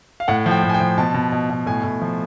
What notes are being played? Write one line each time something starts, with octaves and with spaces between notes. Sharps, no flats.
F5
A2 F#5
F3
G5
A2
G#5
G5
F3
B2 A5
B2
B2
B2
A2 G#5
A2
F3